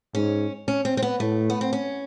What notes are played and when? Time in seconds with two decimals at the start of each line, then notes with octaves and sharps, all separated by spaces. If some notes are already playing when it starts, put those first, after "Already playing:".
0.15 G#2 C#4
0.68 C#4
0.85 C4
0.97 C4
1.03 B3
1.20 A2 A3
1.50 B3
1.61 C4
1.73 C#4